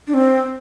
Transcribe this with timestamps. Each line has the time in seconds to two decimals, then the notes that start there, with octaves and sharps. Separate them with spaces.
0.07 D4
0.14 C4